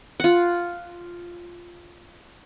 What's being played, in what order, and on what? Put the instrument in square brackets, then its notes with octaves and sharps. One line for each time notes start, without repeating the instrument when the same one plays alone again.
[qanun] F4 F#5